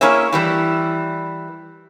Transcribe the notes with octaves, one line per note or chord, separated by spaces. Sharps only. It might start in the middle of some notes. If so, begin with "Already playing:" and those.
A#3 C#4 E4 G#4 C#5 E5
E3 G3 E4